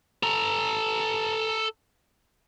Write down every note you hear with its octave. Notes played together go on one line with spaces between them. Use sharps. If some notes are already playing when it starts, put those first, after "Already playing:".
A4 A#5